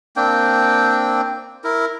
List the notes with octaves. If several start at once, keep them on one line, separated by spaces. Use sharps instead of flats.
A#3 C4 D4 G5
E4 A#4